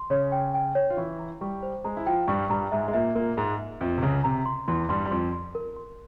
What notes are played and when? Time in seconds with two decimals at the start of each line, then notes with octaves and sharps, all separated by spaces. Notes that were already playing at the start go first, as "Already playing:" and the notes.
Already playing: C6
0.10 C#3 C#4 C#5
0.32 G5
0.54 G5
0.75 C#5
0.90 F4
0.97 E3 E4 C#6
1.19 A#5
1.41 G3 G4 C#6
1.63 C5
1.84 G#3 G#4 A#5
1.97 E4
2.06 F3 F4 G5
2.28 G2 G3 C#6
2.49 G2 G3 A#5
2.72 G#2 G#3 E5
2.88 G#3
2.93 A#2 A#3 E5
3.15 A#2 A#3 A#4
3.37 G#2 G#3 A#4
3.59 E5
3.81 F2 F3 E5
3.98 C3
4.02 C#2 C#3 A#5
4.24 C3 A#5
4.46 C6
4.68 E2 E3 C6
4.89 G2 G3 C6
5.05 G3
5.11 F2 F3 C6
5.33 C6
5.55 A#4
5.76 C6